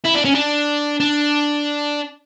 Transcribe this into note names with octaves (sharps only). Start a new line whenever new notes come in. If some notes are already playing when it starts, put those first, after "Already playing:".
E4
D4
C#4
D4
D4